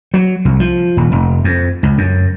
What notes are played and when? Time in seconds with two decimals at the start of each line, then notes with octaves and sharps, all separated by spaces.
0.14 F#3
0.45 C2
0.60 F3
0.97 D#1
1.12 F1
1.44 F2
1.83 C#2
1.98 F#2